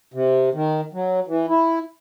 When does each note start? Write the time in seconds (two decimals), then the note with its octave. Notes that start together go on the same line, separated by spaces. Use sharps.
0.14 C3
0.54 D#3
0.93 F#3
1.28 E3
1.49 E4